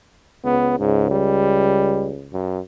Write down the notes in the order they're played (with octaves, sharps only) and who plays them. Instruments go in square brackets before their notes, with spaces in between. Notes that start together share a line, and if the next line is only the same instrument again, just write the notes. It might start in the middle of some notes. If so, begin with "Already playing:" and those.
[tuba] C#2 [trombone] B3
[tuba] C#2 [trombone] G#2
[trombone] G3
F#2